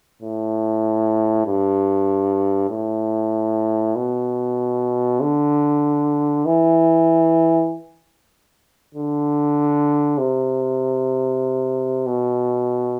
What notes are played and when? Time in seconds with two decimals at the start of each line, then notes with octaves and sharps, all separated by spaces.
0.22 A2
1.47 G2
2.70 A2
3.96 B2
5.21 D3
6.45 E3
8.95 D3
10.18 C3
12.06 B2